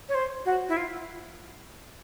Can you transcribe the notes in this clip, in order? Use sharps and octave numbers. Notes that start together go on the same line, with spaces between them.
C#5
C5
F#4
E4
F4